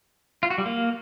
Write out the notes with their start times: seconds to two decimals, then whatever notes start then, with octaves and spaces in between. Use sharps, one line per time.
0.43 F4
0.50 F#4
0.58 G3
0.66 A#3